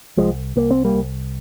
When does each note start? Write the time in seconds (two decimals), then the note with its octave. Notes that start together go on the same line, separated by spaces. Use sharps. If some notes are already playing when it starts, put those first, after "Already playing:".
0.17 C2 F3 G#3
0.56 C2 A#3
0.71 C4
0.85 G3 A#3
0.94 C2